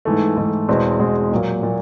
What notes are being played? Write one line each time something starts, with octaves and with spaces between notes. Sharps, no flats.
G#2 E3 A3
G#2 E3 A3
E2 B2 G#3 C4
E2 B2 G#3 C4
A#2 F#3 A#3
A#2 F#3